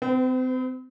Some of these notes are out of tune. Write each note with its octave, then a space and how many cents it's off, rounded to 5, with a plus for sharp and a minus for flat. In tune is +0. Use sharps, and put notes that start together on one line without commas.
C4 -35 B4 +40